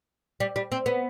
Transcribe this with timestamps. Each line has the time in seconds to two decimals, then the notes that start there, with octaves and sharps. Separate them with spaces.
0.40 G3
0.56 G3
0.72 C4
0.86 B3